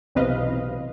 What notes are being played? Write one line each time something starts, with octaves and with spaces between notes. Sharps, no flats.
B1 E2 C3 B4 D#5 F5